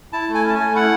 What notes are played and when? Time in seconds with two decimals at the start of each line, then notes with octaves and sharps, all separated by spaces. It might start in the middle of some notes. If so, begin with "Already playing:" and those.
0.13 E4 A5
0.28 A3
0.34 G#5
0.44 C#4 A5
0.55 A3 G#5
0.75 E4 F#5